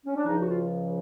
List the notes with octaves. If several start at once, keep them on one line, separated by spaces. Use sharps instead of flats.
C#4
D4
C#2 C#3 F3 D#4
F#4
F4